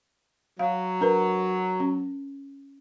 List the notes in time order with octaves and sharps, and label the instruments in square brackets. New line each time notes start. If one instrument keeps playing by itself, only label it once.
[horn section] F#3 [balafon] F5
[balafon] D4 A#4 B4
C#4